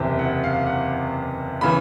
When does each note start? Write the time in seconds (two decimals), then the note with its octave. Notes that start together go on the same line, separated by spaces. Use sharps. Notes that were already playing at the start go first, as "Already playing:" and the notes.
Already playing: F#1 E2 C3 G5
0.19 F#5
0.44 F5
0.66 F#5
1.61 C#3 E3 B5